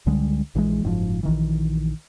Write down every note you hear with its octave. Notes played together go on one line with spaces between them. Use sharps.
C#2 D3 G3 G#3
A#1 E3 F3 G#3
F#1 G#2 C3 F3
A#1 D#3 E3